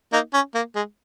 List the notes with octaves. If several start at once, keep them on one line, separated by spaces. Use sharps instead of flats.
A#3 D#4
C#4
A#3
G#3